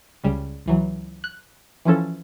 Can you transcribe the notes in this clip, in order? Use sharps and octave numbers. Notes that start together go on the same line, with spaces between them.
C#2 C#3 G3
C#2 E3 F#3
F#6
E3 F3 C#4 A4